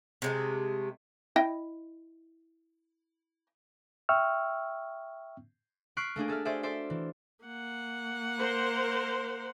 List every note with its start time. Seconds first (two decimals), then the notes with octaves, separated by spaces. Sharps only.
0.22 C3 G#3 A3
1.36 E4 D#5 G5
4.09 E5 G5 C#6 E6 F6
5.97 C#6 F6 F#6 B6 C7 D7
6.16 A3 A#3 D4 G#4
6.28 G#4 A4 E5 F6
6.45 F#4 G#4 C5 D5 E5
6.63 A4 C5 D5 E5
6.90 E3
7.45 A#3 F#5
8.38 A#4 C5